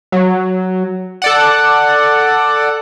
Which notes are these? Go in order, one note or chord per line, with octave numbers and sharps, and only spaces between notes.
F#3
A4 D5 F#5